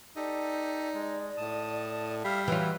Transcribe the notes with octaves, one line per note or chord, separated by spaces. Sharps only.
D#4 G4 A4 D5
G#3
A2 A5 D#6
G3 E5 F5
E3 F#3 F4 B4